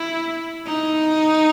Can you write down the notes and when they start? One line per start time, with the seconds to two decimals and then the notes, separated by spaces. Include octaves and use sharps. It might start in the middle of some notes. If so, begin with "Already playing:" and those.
Already playing: E4
0.66 D#4